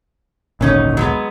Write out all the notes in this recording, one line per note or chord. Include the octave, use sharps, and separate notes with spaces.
G#1 D2 A#2 F#3 C#4 D#4
F#3 G#3 B3